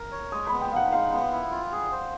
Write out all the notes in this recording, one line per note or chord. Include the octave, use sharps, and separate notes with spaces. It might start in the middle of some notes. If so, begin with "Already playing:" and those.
Already playing: A#4
C#5
G#3 D#6
B3 B5
G5
D#4 F5 F#5
G#3 F5
B3
E4
F4
G#4
C5